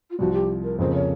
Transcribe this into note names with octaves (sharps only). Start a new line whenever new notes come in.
F4
C2 C3 F3 F#4
G4
A#4
F2 C#3 F3 A#3 C5
C#5